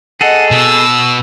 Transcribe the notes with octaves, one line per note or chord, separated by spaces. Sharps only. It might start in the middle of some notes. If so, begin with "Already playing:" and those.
G#4 A4 D#5 F#5
B2 E6